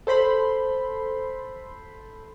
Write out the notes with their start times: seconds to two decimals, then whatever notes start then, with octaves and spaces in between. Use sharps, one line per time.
0.07 A4 C5 B5 C6